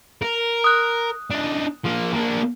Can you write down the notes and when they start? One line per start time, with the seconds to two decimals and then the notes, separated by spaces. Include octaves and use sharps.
0.22 A#4
0.64 D#6 F#6
1.31 D4 D#4
1.84 F3 A#3
2.13 A#3 D4